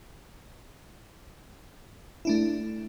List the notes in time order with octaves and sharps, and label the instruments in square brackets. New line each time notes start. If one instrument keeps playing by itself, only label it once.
[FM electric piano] A3 D4 E4